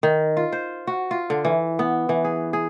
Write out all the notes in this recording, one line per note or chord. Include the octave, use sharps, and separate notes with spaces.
D#3
F4
C5
F#4
F4
D3
E3
B3
E3
G#4
G#4